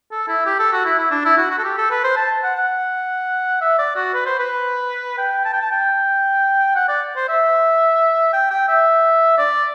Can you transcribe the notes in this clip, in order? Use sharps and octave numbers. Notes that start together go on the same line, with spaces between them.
A4
E4
G4
A4
F#4
E4
E4
D4
E4
F#4
F#4
A4
G4
A4
B4
C5
A5
F#5
F#5
E5
D5
F#4
B4
C5
B4
G5
A5
G5
A5
G5
F#5
D5
C5
E5
G5
G5
E5
D5